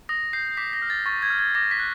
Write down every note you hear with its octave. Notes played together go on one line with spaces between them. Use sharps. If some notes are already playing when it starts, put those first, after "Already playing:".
D#6 A#6
G6 C7
D6 B6
A#6
F6
A6
C#6 A6
G#6
F6
G#6
D6 A#6
B6
F#6